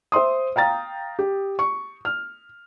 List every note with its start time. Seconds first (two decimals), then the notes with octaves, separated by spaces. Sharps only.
0.12 C5 E5 C6 D#6
0.56 F5 G5 A#5 A6
1.19 G4
1.59 C#6
2.05 F6